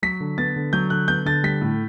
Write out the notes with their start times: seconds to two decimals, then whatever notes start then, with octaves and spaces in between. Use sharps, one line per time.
0.02 F#3 B6
0.20 D3
0.38 B3 A6
0.56 D3
0.73 F#3 G6
0.90 D3 F#6
1.08 B3 G6
1.25 D3 A6
1.43 G3 B6
1.61 A2